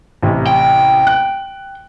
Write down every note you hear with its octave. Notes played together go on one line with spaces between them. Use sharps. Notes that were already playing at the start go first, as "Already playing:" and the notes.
A1 C3
G5
F#6